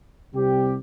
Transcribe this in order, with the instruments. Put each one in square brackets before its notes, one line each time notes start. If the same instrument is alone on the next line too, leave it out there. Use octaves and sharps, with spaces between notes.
[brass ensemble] C2 C3 G3 C4 G4